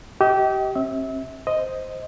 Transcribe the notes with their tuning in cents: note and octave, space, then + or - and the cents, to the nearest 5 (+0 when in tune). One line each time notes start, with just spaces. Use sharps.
G4 -25 D#5 +25
C4 +40 E5 -30
C5 +0 D#5 +0